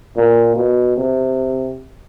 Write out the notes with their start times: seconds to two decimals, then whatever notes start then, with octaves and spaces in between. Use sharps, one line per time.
0.17 A#2
0.56 B2
0.97 C3